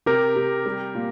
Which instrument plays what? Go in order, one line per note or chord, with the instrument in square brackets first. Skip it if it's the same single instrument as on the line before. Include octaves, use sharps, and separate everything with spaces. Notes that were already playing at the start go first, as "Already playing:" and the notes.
[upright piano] C3 [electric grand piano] G4 A#4
[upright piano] C3
G3
A#2